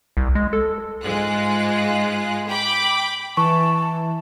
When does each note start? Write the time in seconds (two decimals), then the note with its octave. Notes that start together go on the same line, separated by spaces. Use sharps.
0.17 C2
0.35 G#3
0.53 A4
1.03 G#2 G#3 F4 F#6
2.47 G5 B5 D6
3.37 E3 A5 C#6